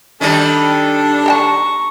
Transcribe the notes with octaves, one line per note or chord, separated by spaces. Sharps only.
D#3 G3 D4 D#4 A4
A4 G5 A5 A#5 C#6